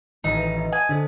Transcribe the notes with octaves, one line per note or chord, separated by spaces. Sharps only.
A1 D#3 E3 D#4
B4 E5
D#5
G#5 D#6
D3 D4 A4 C5